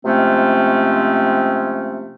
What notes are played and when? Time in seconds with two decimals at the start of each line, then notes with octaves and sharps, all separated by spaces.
0.05 C3 F3 G#3 A3 C4 C#4